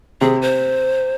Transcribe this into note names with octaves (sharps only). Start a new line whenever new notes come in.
C3 G#4
C5